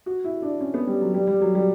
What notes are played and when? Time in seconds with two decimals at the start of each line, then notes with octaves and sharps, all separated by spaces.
0.06 F#4
0.24 E4
0.42 D4
0.61 C#4
0.74 B3
0.87 G3
1.01 F#3
1.14 G3
1.27 G3
1.42 F#3
1.55 G3